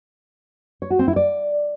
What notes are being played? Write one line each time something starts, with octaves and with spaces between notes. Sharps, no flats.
C#5
F#4
C4
E4
D5